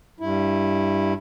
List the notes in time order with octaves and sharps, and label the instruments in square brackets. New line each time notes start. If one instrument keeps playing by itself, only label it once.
[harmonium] G2 E4